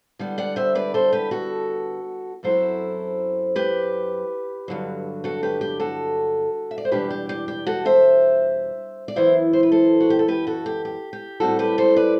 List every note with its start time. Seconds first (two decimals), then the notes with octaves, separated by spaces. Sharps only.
0.19 D3 G3 B3
0.38 D5 F#5
0.56 C5 E5
0.75 B4 D5
0.94 A4 C5
1.13 G4 B4
1.31 F#4 A4
2.43 F#2 F#3 C4 E4 A4 C5
3.56 G4 B4
4.68 G2 D3 F#3
5.24 F#4 A4
5.43 G4 B4
5.61 G4
5.80 F#4 A4
6.71 E5
6.78 D5
6.85 C5
6.92 E2 B2 G3 D4 G4 B4
7.10 G4
7.29 G4
7.48 G4
7.67 F#4 A4
7.85 C5 E5
9.08 D5
9.16 F#2 E3 B3 E4 C5 E5
9.53 C5
9.63 B4
9.72 A4 C5
10.00 F#4
10.10 G4
10.19 A4
10.28 G4 B4
10.47 F#4 A4
10.66 G4
10.85 G4
11.13 G4
11.40 A2 G3 C4 F#4 A4
11.59 G4 B4
11.78 A4 C5
11.96 B4 D5